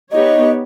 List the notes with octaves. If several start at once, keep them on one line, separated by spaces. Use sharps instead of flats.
B3 D#4 G4 C#5 D#5